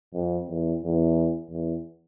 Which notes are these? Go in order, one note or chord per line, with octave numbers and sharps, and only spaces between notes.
F2
E2
E2
E2